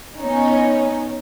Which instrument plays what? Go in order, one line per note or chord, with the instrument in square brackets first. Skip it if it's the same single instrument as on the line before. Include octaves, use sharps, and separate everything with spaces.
[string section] B3 C#4 D#4